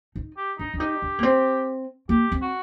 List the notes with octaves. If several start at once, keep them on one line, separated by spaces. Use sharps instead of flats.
D#4
G4
D4 D#4
D4
D#4 G4
D4
A#3
C4
A#3 G4
C4
F#4